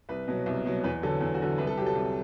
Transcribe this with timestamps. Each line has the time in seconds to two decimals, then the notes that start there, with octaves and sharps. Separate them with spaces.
0.09 C2 B4
0.28 B2 F#3
0.46 C2
0.65 B2 F#3
0.84 E2 B4
1.03 D3 F#3 A4
1.21 E2
1.34 F#4
1.40 D3 F#3
1.58 C2 B4
1.67 A4
1.77 C3 F#3 G4
1.86 A4
1.95 C2